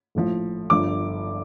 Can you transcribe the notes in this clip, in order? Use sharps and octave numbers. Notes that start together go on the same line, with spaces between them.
A#1 A2 F3
G1 G2 F3 D6